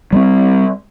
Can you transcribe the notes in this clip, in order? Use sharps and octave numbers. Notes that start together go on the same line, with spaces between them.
G3 G#3 C4